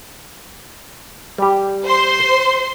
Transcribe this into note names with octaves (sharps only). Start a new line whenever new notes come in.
G3 G4
C5 C6